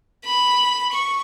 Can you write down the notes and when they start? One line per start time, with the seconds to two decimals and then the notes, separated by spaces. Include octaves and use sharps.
0.25 B5
0.92 C#6